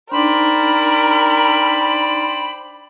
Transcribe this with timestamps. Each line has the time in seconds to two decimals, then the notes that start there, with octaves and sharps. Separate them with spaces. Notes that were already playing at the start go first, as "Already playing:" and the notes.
0.12 D4 D#4 A#4 C5 D5 G5 B5